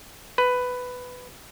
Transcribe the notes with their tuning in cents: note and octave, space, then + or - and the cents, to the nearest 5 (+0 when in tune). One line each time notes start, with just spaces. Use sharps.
B4 +10